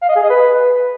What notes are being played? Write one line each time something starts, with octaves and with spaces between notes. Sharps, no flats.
F5
D#5
G#4
D#5
B4